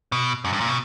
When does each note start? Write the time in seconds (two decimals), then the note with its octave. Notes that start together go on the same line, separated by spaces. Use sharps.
0.12 B2
0.45 F#2
0.53 G2
0.60 A#2
0.69 B2